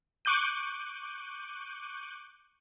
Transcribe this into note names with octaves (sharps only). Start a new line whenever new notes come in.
C#6 D6 F#6 G6 D#7